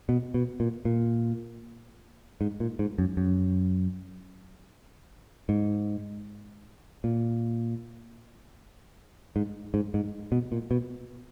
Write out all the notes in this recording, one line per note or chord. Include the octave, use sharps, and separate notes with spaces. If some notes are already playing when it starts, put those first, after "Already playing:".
B2
B2
A#2
A#2
G#2
A#2
G#2
F#2
F#2
G#2
A#2
G#2
G#2
G#2
B2
A#2
B2